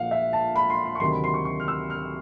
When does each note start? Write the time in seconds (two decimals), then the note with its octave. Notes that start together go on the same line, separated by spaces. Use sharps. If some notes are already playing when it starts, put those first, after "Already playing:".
Already playing: A#1 A#2 F3 F5 F#5
0.11 E5
0.33 A5
0.56 B5
0.70 C6
0.85 C6
0.95 C#6
1.00 D2 C3 D#3 F#3 C6
1.12 B5
1.24 C6
1.34 C#6
1.45 C#6
1.60 F6
1.68 E6
1.90 F6